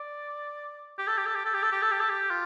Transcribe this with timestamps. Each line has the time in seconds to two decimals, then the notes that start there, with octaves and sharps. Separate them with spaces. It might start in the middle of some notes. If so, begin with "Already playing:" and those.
Already playing: D5
0.99 G4
1.07 A4
1.18 G4
1.26 A4
1.35 G4
1.45 A4
1.54 G4
1.63 A4
1.72 G4
1.82 A4
1.91 G4
2.00 A4
2.09 G4
2.31 F4